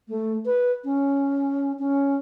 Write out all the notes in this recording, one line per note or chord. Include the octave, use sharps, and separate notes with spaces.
A3
B4
C#4
C#4